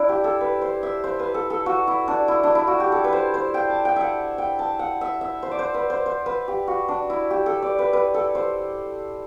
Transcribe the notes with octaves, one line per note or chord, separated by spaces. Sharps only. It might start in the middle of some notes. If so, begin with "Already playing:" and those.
Already playing: D4 E4
G4
A4
B4
C5
E5
C5
B4
A4
A4
F#4
E4
D4
E4
D4
E4
F#4
G4
A4
B4
C5
C5
G5
A5
G5
E5 F#5
G5
A5
F#5
E5
E5
C5
D5
C5
B4
C5
C5
B4
G4
F#4
D4
E4
G4
A4
D5
B4
B4
A4
C5